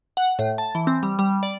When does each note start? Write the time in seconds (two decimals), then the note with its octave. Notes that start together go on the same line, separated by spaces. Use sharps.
0.17 F#5
0.39 A2
0.58 A5
0.75 E3
0.87 C4
1.03 G3
1.19 G3
1.43 D5